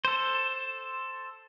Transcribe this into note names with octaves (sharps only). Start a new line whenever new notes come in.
A4 C5